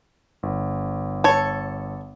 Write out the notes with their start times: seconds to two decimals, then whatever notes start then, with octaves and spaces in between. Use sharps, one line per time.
0.43 G1
1.24 A4 C#5